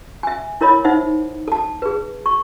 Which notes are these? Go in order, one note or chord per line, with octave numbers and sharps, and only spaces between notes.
E5 G#5
E4 A#4 C#5 D#5 B5
D#4 C5 E5 F#5
A4 A5
G#4 B4
C#6